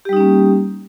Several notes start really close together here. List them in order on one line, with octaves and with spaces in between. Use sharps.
G4 G3 D#4 C#4 A#3